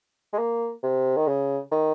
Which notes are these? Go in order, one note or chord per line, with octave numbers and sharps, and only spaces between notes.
G#3
A#3
C3
D#3
C#3
D#3